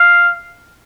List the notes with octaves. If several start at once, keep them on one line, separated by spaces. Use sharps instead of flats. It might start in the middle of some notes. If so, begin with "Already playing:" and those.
Already playing: F5